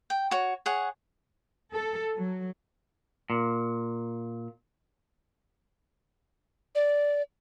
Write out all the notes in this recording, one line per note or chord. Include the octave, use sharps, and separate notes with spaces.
G5
F#4 C#5
G#4 C#5 F#5
A4
F#3
A#2
D5